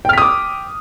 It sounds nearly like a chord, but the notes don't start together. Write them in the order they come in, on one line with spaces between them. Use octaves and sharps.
G5 F6 B6 D#6 D6